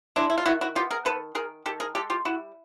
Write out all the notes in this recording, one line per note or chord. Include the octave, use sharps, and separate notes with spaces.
G#3 D4 E4
E4
F4
D#3 E4 F#4
E4 F#4
B3 F4 G4
G#4 A#4
D#3 A4 B4
D#3 G#4 A#4
D#3 G4 A4
G#4 A#4
G#3 G4 A4
F4 G4
G3 E4 F#4